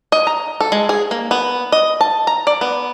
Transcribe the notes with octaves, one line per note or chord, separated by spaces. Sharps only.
D#5
A#5
A4
G#3
G#4
A#3
B3
D#5
A5
A#5
D5
B3